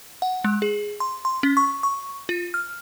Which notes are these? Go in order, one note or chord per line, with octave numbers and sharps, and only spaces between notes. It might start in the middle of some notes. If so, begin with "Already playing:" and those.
F#5
G#3
G#4
C6
C6
C#4
C#6
C#6
F4
F6